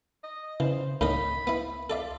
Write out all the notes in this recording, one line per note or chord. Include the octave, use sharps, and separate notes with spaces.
D#5
C#3 E3 C5
C#2 A2 D#3 D#5 B5
B3 E4
F4 A4 D5 E5